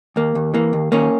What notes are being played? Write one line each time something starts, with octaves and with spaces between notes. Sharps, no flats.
D#2 A#3
D#2
E3 A#3
D#2
D#2 A#3 C#4